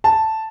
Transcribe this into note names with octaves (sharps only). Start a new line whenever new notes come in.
A5